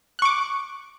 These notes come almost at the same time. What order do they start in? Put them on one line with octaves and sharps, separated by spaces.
F#6 C#6 D6